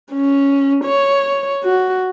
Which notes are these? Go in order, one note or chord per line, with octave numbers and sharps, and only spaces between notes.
C#4
C#5
F#4